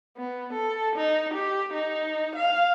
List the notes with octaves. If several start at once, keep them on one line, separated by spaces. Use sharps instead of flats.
B3
A4
D#4
G4
D#4
F5